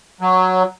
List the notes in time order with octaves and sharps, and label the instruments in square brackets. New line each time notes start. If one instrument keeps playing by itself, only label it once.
[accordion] F#3